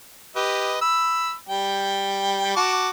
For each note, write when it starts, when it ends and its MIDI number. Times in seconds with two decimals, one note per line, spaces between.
0.36 0.78 67
0.36 0.78 71
0.36 0.78 75
0.82 1.34 83
0.82 1.34 88
1.49 2.54 55
1.49 2.54 79
2.56 2.90 66
2.56 2.90 81
2.56 2.90 86